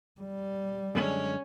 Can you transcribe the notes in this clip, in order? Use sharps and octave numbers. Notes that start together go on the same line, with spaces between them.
G3
F#2 D3 G#3 C#4